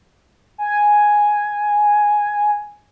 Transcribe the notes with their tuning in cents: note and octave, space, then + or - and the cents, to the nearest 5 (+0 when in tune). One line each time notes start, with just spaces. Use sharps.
G#5 +0